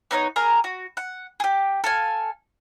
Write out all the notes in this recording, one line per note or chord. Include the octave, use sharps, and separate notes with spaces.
B3 D#4 A4 C#5
G#4 A#4 A#5
F#4
F#5
G4 G#4
A4 F5 G#5